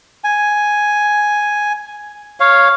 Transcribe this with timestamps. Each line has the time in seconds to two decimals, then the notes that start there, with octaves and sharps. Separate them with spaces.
0.24 G#5
2.40 C#5 F5